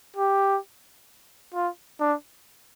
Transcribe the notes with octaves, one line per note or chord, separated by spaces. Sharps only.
G4
F4
D4